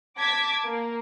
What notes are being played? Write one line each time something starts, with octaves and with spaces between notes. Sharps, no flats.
A5 D6 G#6 B6
A#3